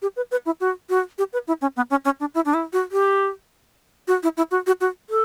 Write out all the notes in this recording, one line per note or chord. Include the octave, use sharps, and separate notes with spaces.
G4
B4
B4
E4
F#4
F#4
G4
B4
E4
C#4
B3
C#4
C#4
D4
E4
D4
E4
F#4
G4
F#4
E4
E4
F#4
F#4
F#4
A4